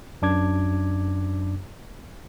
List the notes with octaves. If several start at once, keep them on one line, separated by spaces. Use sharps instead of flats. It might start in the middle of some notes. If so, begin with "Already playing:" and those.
F#2 D4 D6 G#6